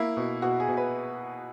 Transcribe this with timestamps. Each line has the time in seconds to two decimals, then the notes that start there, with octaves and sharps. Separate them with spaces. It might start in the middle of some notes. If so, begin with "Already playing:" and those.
Already playing: A#3 E4
0.17 B2
0.42 B2 F#4
0.60 G#4
0.68 B2
0.77 B4